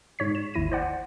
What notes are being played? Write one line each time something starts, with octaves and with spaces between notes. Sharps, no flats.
G#2 C#5 B6
E7
G#1 D#2 E4 A#6 D#7
C5 D5 F#5